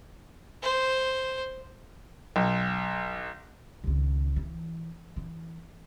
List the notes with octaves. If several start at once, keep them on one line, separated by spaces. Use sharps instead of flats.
C5
B1
C#2 D#3
E3
E3